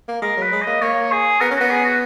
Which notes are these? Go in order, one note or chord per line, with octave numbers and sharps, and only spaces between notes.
A#3
G#3 A#4
F#3 B4
G#3
D#5
A#3
A#3 C#5
G#4
B3 A#4
C#4 F#4
B3
G#4
F#4